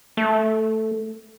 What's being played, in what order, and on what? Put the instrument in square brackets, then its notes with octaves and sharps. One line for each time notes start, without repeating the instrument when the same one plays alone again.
[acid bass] A3